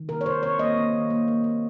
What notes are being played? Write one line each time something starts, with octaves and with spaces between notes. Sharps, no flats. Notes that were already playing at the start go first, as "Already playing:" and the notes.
Already playing: D#3
C3 A#4
C#5
C3 C5
C3 C#5
A#3 D#5
A#3
D#3
A#3
A#3
A#3